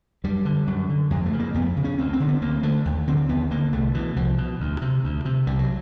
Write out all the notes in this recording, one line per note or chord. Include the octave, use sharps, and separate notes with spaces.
F#2 G3
D3
F#2
D3
F2 G#3
A3
C#3
A#3
F2 B3
C#3
C#4
D2 C4
C4
D3
B3
D2 A#3
D3 A3
D#2
D3 C4
D#2 B3
D3 A#3
C2 A3
B2 E3
C2 F3
B2
D2
C3
D2
C3
C2 G3
F#3